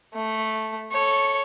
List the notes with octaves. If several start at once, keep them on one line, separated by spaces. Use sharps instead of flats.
A3
A4 C#5